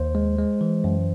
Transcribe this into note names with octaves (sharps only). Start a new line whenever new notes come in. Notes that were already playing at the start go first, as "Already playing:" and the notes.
Already playing: D#2 C5
G#3
G#3
E3
F#2